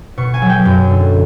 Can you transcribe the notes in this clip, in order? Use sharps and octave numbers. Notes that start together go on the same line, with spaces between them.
B2 C#6
G#5
F#3
G5
F#2
D3